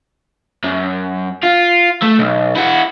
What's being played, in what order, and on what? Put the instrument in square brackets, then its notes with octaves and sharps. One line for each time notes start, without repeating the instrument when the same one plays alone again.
[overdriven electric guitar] F#2
F4
A3
B1
E4 F#4